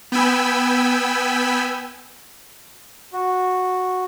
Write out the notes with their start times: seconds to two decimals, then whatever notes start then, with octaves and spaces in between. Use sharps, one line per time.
0.12 B3 G5 G#5 B5 E6
3.13 F#4